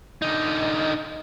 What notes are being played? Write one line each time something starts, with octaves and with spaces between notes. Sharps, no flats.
D3 D#4